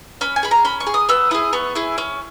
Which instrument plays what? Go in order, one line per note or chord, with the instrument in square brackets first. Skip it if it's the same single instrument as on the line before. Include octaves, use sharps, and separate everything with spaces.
[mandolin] C#4 B5
G#5
G#4 B5
A#5
C#4 B5
C#6
G#4
D#6
B3 E6
E4 G#4 D#6
B3 C#6
E4 G#4
C#4